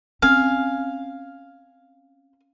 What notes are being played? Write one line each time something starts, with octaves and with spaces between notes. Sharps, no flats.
C4 C#4 F5 G#5